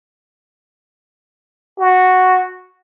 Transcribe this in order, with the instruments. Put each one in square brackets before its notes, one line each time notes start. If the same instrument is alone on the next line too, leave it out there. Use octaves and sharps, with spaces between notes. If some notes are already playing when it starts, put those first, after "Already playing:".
[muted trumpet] F#4